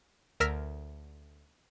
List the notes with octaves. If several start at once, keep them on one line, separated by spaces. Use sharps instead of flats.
D2 A#4 E6 F6 A#6 B6